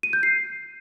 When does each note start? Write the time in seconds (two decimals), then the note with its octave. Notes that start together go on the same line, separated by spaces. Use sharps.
0.03 D#7
0.13 G6
0.23 C7